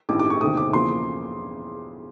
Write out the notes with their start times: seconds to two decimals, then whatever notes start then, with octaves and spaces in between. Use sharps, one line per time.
0.09 A1 G2 D#3 G3 D6
0.19 D6
0.30 C#6
0.41 E1 D2 C3 D#3 D#6
0.57 D6
0.73 E2 C#3 F3 A#3 C6